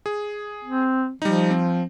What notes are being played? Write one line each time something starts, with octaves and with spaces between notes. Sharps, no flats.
G#4
C4
F3 G3 D#4
C4